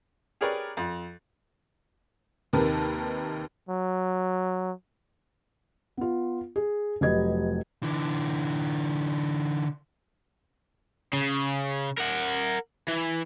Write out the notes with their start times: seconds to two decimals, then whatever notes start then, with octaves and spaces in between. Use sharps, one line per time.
0.41 G4 G#4 A#4 B4 C#5 D5
0.77 F2
2.53 D#2 C3 D#3 A#4 B4 A5
3.69 F#3
5.97 B3 F4
6.56 G#4
7.01 F1 F#3 G4 B4 D#5 G#6
7.83 D3 E3
11.13 C#3
11.98 A#4 F#5
12.88 E3